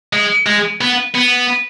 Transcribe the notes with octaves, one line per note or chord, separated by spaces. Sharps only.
G#3
G#3
B3
B3